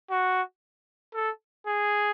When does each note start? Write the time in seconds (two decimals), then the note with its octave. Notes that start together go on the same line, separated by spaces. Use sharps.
0.11 F#4
1.14 A4
1.66 G#4